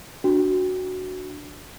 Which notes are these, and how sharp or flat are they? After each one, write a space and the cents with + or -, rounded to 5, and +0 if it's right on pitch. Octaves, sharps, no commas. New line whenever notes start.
D4 +0 F#4 +0